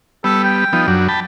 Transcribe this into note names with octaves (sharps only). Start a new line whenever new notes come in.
G3 B3 A4
G5
F3 B3 D#4
F#2 F#3 D4
G5 A5 B5